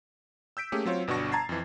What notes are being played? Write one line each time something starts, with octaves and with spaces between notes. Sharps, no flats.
E6 G6 B6 D7
A3 A#3 C#4 G4 G#4
F#3 C4 F4 C#5
G1 B2 D4 F#4 C#6 A#6
A5 A#5 G#6 A6 C7
F2 E3